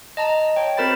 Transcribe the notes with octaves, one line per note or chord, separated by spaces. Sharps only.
D#5 A5 A#5
C#5 G5
C4 F#4 A#4 C5 B5 A6